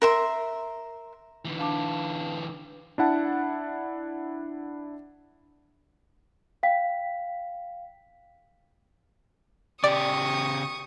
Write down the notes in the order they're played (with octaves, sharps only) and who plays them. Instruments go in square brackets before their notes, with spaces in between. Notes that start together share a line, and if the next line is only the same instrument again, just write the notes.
[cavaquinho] A#4 E5 C6
[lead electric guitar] D3 E3
[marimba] D4 [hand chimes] F5 A5 D6
[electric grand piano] D4 E4 F#5 A5
[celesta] F5 G5 B6
[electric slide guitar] C#3 G4 [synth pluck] D5 [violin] C#6 D#6